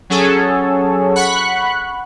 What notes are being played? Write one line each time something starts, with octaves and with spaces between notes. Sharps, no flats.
F#3 C#4 G#4 A4 C#5
F#5 B5 C#6 F#6